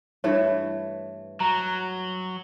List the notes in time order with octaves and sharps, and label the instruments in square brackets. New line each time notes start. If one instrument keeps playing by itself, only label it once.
[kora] G2 E3 A3 [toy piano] C#5
[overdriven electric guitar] F#3 [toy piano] A#5